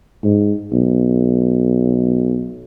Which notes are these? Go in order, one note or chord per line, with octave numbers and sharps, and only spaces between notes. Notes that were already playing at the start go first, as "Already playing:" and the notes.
G#2
B1